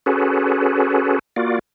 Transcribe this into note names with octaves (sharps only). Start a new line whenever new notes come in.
C#4 F#4 G#4 A4 B4
A#3 F4 F#4 D5